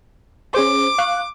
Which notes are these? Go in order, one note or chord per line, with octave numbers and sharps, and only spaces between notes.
C#4 G#4 C5 D6
F5 C#6 F#6